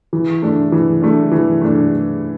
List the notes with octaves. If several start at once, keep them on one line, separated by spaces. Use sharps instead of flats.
E3
A3 D4
E3
A3 D4
E3
A3 D4